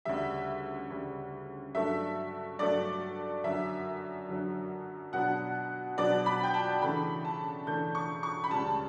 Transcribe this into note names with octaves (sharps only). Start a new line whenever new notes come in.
D2 C#3 G3 E5
D2 C#3 G3
G2 F#3 A3 D4 E5
G2 F#3 A3 D4 D5
F#2 D3 F#3 E5
F#2 D3 F#3
B2 F#3 B3 D4 F#5
B2 F#3 B3 D4 D5
B5
G5
A5
C#3 E3 A3 D4 B5
A5
C#3 E3 A3 D4 G6
C#6
C#6
B5
C#2 C#3 G3 A5